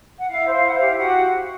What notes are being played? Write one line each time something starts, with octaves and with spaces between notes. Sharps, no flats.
F#5
E4 F5
C5
F5
E4 F#5
F5
G4
F#4 F#5